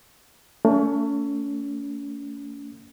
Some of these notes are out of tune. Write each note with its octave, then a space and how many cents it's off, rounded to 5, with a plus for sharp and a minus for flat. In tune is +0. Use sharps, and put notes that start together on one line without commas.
A3 +30 C#4 +40